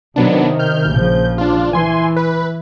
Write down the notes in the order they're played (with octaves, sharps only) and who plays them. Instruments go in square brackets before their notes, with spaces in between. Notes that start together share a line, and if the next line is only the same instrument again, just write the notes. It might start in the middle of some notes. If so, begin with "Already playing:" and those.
[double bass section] C3 D#3 [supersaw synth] F#3 B3 D4
[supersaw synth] F6 G6
[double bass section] A#1 C#3 F3 [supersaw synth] G6
[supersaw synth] D4 F4
[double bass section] E3 [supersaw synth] G#5 C6
[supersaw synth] B4